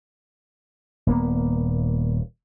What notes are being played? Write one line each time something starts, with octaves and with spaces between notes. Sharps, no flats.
D#1 A#3 B3